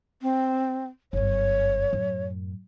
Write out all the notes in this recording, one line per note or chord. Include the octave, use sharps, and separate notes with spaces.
C4
G1 F#2 C#5
F#2 A2